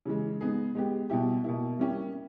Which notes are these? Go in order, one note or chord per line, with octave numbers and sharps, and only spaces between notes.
C#3 E3 G#3
G#3 B3 D#4 G#4
G#3 B3 G4
B2 G3 B3 E4 G4
B2 A#3 E4
G3 A#3 C#4 E4 G4